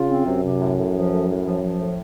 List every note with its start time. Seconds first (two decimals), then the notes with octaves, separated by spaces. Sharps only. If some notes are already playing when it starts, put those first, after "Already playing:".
Already playing: C#3 F4
0.09 C4
0.26 F#2 C3
0.43 C3
0.60 A2
0.78 A2
0.94 F3
1.12 A2
1.29 A2
1.46 F3
1.62 F3
1.79 A2